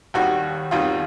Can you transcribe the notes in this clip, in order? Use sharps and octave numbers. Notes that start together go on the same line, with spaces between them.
D#2 D#3 G3 F#4
D#2 D#3 G3 F4